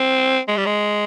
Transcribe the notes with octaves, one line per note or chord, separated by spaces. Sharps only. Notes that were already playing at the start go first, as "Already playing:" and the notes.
Already playing: C4
G#3
G3
G#3